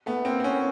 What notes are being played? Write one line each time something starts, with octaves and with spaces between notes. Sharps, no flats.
A3 B3
A#3 C4
C4
B3 C#4